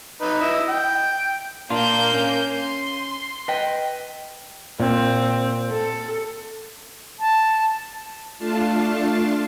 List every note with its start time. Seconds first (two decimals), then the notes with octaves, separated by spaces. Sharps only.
0.21 D#4 B4
0.41 E4 D#5 E5
0.68 G5
1.70 A#2 A#3 D4 F4 G6
2.13 C#4
2.53 C6
3.48 B4 D#5 G5
4.80 A#2 C4
5.71 A4
7.20 A5
8.39 A3 D4 F4 F5 A5